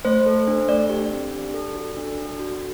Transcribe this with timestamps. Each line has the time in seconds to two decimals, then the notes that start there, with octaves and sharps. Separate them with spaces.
0.05 A3 C5
0.26 A4
0.47 D4
0.68 A3 D5
0.90 G4
1.11 C4
1.32 D4
1.54 A4
1.75 F#4
1.97 D4
2.19 A4
2.40 F#4